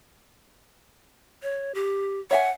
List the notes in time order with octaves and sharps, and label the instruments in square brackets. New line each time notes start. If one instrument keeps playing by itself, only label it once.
[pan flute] C#5
G4
[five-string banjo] C#5 E5 G#5 [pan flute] F#5